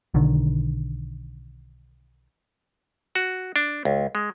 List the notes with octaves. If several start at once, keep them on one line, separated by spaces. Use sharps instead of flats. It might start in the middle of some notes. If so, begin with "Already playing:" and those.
B1 D3 D#3
F#4
D4
C#2
G#3